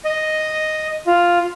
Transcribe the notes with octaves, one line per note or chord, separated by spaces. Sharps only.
D#5
F4